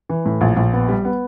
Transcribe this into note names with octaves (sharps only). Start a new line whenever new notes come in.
E3
A2
A#1
A#1
B3
G3
B3